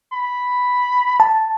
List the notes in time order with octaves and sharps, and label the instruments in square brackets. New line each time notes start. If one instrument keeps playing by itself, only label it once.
[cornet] B5
[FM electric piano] A5